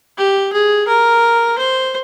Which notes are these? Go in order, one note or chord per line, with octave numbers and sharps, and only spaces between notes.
G4
G#4
A#4
C5